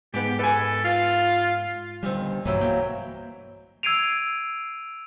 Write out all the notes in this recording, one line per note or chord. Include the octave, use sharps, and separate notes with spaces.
G#2 B3 G4
A4 B4 G#5
F4 F5
A#2 D3 D#3 G3 C4
B1 G2 E3 F#3 A#3 E4 G5
A#2 A#3 G5
E6 G#6 C7 D7 D#7 F7